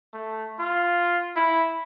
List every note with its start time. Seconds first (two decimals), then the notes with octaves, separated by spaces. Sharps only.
0.14 A3
0.60 F4
1.36 E4